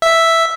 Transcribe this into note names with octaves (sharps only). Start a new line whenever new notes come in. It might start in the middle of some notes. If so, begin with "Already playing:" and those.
E5